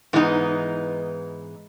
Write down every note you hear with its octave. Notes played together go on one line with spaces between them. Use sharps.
G#2 E3 G#3 B3 D#4